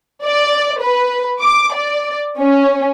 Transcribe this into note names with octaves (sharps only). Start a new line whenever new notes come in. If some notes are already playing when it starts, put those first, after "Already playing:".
D5
B4
D6
D5
C#4